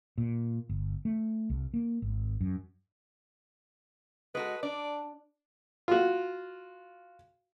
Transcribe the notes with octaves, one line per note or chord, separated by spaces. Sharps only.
A#2
G1
A3
C2
A#3
G#1
F#2
G#3 F#4 A4 B4
D4 D5
F4 F#4